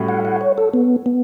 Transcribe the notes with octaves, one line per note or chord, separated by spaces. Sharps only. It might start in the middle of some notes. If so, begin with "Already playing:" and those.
Already playing: A2 G3 C#4 F#4
F#5
F#5
C#5
A4
B3
B3